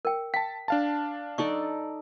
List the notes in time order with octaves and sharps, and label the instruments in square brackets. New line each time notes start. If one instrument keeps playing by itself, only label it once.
[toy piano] A#4 G5
[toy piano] G5 [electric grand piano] A5 B6
[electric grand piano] D4 F5 A5
[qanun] D#4 A4 D5 [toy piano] C#6